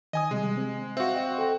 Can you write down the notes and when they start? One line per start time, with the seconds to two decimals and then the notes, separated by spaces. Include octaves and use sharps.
0.13 D#3 D#5 G#5 D#6
0.31 C3 G3 G#3
0.57 C4
0.97 C4 F#4 E5 F5
1.15 D#5 G5
1.38 A4 G5